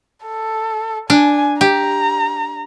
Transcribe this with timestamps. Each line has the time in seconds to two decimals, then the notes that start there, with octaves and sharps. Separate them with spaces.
0.25 A4
1.10 D4 G#5
1.61 G4 A#5